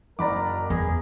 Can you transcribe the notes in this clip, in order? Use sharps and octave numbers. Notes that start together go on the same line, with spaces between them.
F#1 A#4 D5 A#5 B5 D6
E2 G#4 A#6